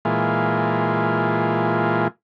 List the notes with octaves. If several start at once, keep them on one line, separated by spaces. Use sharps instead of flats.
A#2 E3 G#3 F4